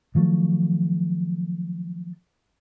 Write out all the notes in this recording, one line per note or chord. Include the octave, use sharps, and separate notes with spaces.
D#3 F3 F#3 A3